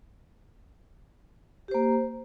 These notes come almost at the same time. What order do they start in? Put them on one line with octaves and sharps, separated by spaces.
G4 C5 A#3